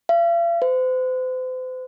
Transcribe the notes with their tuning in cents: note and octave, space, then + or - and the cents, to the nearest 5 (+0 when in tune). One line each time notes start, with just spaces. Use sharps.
F5 -45
C5 -40